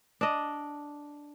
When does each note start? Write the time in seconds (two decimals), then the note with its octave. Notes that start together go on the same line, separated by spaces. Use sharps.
0.21 D4 D#5